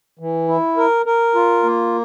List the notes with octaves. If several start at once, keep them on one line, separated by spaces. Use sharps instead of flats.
E3
E4
A#4
A#4
F4
A#3